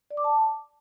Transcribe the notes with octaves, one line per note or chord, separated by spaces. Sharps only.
D5
D6
A5